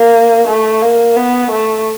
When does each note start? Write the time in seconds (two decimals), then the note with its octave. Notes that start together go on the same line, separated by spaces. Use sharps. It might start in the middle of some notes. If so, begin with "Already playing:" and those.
Already playing: A#3
0.48 A3
0.82 A#3
1.16 B3
1.51 A3